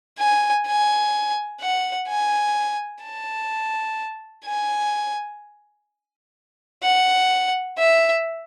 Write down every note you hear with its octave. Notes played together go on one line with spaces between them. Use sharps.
G#5
G#5
F#5
G#5
A5
G#5
F#5
E5